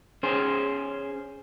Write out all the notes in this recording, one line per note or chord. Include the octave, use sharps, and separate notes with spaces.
C#4 G#4 C5